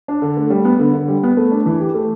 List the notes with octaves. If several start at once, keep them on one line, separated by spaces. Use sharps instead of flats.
D4
D3
A3
G3
B3
D3
D3
G3
B3
A3
D4
E3
G4
A3